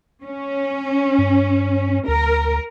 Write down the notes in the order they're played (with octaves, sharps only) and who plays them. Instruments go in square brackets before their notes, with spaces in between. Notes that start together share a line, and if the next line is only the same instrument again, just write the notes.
[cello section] C#4
[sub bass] G2
[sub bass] D2 [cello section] A#4